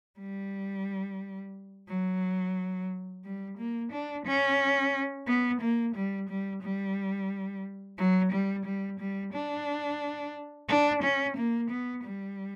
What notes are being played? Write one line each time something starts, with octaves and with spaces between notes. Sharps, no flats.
G3
F#3
G3
A#3
D4
C#4
B3
A#3
G3
G3
G3
F#3
G3
G3
G3
D4
D4
C#4
A#3
B3
G3